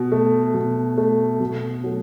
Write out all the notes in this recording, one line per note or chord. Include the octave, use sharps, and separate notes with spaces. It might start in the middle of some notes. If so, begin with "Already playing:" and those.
Already playing: B2
A3
B2
A3
B2
F#3 A3